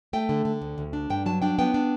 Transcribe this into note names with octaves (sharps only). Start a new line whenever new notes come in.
A3 G5
D3
D3
D2
D2
D4
G2 G5
F#3 A5
D4 G5
B3 G5
D4